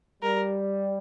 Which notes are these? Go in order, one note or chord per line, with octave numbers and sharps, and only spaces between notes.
G3 A#4